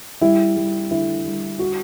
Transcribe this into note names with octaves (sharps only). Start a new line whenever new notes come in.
G3 E4
G3
D3 E4
G3
F#4